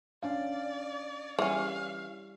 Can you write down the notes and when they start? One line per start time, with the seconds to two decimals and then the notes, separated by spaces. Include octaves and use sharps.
0.23 C#4 D4 D5 F5
1.39 E3 G3 C#4 F5